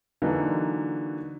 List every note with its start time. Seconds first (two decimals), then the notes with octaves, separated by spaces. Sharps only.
0.22 D3 E3 F#3 A#3 D#4